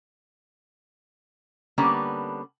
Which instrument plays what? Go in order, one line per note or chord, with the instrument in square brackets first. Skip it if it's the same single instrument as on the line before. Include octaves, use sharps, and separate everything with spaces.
[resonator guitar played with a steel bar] D3 G3 A#3 B3 C#4 D4